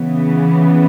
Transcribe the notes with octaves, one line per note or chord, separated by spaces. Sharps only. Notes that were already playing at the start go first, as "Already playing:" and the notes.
Already playing: C#3 E3 B3